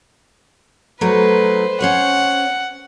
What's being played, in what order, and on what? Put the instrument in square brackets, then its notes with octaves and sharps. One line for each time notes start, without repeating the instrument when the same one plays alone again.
[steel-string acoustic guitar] F#3 A3 D#4 [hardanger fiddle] B4 C5
[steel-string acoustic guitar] C#4 C5 C#5 [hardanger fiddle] F#5